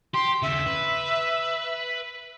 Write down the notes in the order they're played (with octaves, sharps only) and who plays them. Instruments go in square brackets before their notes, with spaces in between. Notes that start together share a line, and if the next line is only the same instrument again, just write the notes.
[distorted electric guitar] G4 [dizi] C6
[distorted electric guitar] D#2 C#3 [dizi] E5
[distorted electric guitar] B4